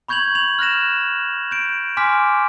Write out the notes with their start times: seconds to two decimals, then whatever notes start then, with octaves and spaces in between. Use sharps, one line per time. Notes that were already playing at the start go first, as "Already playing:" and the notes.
0.08 B5 C#6 G6 G#6 F7 F#7
0.35 F7 F#7
0.59 F6 F#6 A#6 E7
1.51 G6 D7
1.97 G#5 C6 D6 F6 B6